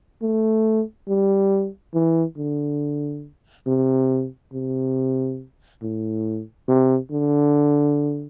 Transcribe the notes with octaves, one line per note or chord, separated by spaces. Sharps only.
A3
G3
E3
D3
C3
C3
A2
C3
D3